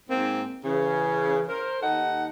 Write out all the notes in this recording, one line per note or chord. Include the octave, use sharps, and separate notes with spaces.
G#2 A#3 C4
C#3 E3
A#4 C5
D#2 D#4 A4 F#5